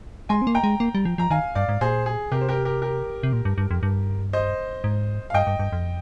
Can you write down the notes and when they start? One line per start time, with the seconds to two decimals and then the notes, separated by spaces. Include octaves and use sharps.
0.29 G#3 G#5 C6
0.42 C4
0.47 A#3
0.55 G5 A#5
0.64 G#3
0.80 A#3
0.95 G3
1.05 F3
1.18 F3 A#5
1.30 D#3 F5 G#5
1.55 G2 D5 F5
1.69 G#2
1.81 A#2 G#4 C5
2.06 G#4
2.32 C3 G4 A#4
2.41 C5
2.49 G4 A#4
2.65 G4 A#4
2.82 G4 A#4
3.23 C3
3.33 A#2
3.45 G2
3.58 G2
3.71 F2
3.83 G2
4.33 C5 D#5
4.84 G#2
5.30 F5
5.34 G2 D#5 G5
5.47 G2
5.59 G2
5.73 F2